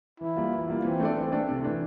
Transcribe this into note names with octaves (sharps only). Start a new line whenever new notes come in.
E3 E4
G3 A#3 F4
E3
G3 A#3 F4
E3 C4
A3 D4 A4 D5
E3 C4
A3 D4 A4 D5
C3
E3 A3 D4